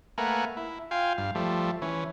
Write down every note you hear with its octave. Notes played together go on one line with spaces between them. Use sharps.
A3 A#3 A#4 B4 F#5 G#5
E4
F4 F5 G5 G#5
G2 F5
F3 G3 A3
E3 C#4